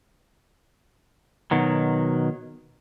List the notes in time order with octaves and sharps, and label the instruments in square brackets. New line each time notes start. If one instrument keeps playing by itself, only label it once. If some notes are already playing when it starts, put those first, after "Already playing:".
[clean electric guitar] B2 D#3 F#3